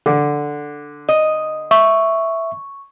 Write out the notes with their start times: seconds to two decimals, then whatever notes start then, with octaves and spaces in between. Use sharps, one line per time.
0.06 D3
1.09 D#5
1.71 E5 C#6